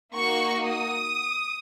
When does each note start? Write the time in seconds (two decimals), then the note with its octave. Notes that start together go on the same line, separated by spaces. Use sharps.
0.15 A#3 D#4 F#4 C#6
0.66 D#6